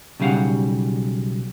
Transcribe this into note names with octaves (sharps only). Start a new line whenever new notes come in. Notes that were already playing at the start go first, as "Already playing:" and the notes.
B1 C#3 G3 F5 F#5